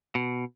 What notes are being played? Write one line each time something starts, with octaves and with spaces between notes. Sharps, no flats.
B2